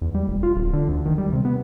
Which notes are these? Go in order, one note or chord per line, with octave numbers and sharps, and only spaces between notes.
E2
G3
F1
F4
D1
D3
D2
D#3
G3
C3
B3